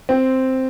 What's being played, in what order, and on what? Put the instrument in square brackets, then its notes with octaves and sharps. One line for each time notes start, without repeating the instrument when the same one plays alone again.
[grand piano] C4